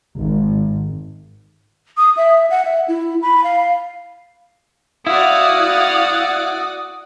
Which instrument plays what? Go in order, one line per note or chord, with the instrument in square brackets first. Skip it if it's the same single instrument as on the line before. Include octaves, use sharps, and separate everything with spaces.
[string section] G#1
[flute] D#6
E5
F#5
E5
E4
B5
F5
[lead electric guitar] E4 [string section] F#4 D5 [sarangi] F5 [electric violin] F#5 D#6